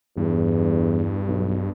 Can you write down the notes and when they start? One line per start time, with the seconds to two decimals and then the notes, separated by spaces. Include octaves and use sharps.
0.17 E2 G2
1.27 B1